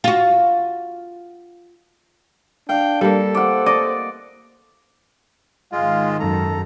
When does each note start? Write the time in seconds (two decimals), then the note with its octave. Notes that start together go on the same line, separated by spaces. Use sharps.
0.04 F4 F#4
2.69 D4 F5 G5
3.01 G3 A#3 A4
3.35 C5 D5 F#5
3.66 D5 D#5
5.72 G#2 D#3 G#3 F4 F5
6.20 F#2 A4 A#5